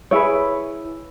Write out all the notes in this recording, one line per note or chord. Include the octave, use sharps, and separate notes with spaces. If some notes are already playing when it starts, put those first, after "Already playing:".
E4 G#4 B4 C#5